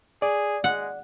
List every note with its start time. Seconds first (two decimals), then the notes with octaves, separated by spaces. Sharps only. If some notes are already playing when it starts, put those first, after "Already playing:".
0.22 G#4 D5
0.64 G#3 F#5